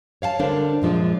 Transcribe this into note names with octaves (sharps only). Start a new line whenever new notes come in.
C#5 F5 F#5 A5
D3 G3 D4 A#4 C5
F#2 A#2 F3 G#3 D4